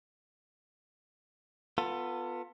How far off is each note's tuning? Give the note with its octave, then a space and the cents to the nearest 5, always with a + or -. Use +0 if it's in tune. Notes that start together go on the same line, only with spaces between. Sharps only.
B3 +0 F4 +15 A4 +30